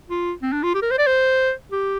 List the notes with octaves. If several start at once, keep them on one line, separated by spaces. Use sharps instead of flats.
F4
C4
D4
F4
G4
A#4
C5
D5
C5
G4